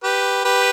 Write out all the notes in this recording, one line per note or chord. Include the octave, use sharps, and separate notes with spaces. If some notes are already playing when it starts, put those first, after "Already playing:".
G4 B4
G4 B4